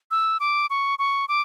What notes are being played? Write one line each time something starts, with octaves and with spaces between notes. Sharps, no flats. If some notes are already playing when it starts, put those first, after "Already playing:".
E6
D6
C#6
C#6
D6